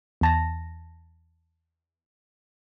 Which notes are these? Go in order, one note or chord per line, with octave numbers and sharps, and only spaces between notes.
E2 A5 A#6